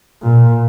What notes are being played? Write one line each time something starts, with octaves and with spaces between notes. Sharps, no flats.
A#2